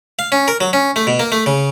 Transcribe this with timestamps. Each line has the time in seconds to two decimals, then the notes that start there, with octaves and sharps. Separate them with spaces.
0.19 F5
0.32 C#4
0.48 A#4
0.61 F#3
0.73 C#4
0.96 A3
1.07 B2
1.19 A#3
1.32 A3
1.46 C#3